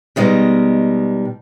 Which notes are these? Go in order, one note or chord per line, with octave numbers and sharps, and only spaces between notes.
B2 D#3 G3 G#3